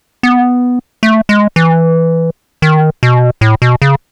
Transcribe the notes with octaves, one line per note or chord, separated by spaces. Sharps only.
B3
A3
G#3
E3
D#3
B2
A2
B2
C#3